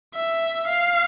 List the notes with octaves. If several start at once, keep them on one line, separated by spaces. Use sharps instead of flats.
E5
F5